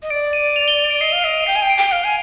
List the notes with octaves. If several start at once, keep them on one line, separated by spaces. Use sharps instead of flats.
D#5
D5 D7
D#7
F7
G7
F7
D7
D#5 C7
F5
D#5 C7
G5 C7
G#5
G5
D7
G5 C7
F5 D7
G#5